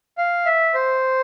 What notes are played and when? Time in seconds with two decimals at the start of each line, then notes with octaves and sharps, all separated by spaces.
0.18 F5
0.46 E5
0.74 C5